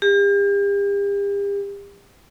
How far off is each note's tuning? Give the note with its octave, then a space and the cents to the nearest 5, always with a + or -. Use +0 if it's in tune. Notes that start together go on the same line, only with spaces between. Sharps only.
G4 +40